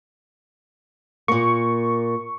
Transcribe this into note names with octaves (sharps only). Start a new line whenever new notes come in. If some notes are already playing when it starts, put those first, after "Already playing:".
A#2 A#3 C#6